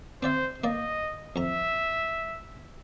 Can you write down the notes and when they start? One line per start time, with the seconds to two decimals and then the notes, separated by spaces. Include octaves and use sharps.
0.23 C4 C5 D5 E5
0.64 A#3 D5 D#5
1.36 F2 E5 A#5